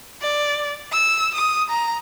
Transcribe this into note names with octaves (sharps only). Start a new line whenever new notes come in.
D5
E6
D#6
A#5